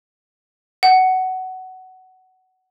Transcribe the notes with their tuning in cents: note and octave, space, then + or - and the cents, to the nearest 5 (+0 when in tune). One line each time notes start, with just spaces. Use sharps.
F#5 +15